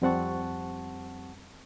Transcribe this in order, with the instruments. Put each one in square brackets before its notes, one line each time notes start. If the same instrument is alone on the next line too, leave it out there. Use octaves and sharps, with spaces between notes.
[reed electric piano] F2 G3 C4 F#5 A5 C#6